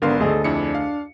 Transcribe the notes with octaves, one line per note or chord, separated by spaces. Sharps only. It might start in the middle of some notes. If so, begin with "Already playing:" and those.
G#1 D3 B3 D4 A#4 F5 C6
D2 G#4 A4 D#5
F2 D4 E4 C#7
F5